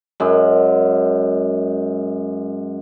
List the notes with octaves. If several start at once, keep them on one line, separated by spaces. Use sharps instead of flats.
F#2 G#3